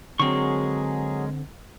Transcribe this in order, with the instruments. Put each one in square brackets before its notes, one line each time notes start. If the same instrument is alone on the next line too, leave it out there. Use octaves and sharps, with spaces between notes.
[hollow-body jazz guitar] D3 C4 [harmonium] F#3 G#4 [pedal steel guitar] G#3 A#4 C#6